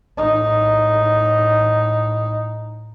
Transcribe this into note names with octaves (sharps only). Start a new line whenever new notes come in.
A2 D#4